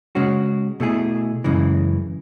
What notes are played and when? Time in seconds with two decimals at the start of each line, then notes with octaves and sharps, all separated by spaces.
0.15 C#3 G#3 C#4 F#4
0.80 B2 A3 E4 G#4
1.44 F#2 C#3 E3 G#3